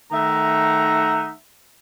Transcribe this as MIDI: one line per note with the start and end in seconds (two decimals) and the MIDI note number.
0.12 1.31 51
0.12 1.31 57
0.12 1.31 63
0.12 1.31 76
0.12 1.31 78
0.12 1.31 82